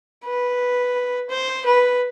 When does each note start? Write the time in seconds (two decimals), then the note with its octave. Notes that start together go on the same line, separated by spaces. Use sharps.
0.25 B4
1.30 C5
1.66 B4